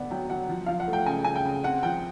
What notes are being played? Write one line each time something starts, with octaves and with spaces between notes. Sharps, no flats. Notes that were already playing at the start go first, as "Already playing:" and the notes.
Already playing: D3 B3 D4 F#5
F#3 G5
F#3 F#5
F3
F3 F5
F#5
A3
G5
C#3 G#5
C#3 G#5
G5
C#3
C4 F#5
F3 G5